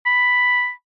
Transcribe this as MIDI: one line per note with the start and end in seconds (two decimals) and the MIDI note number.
0.06 0.70 83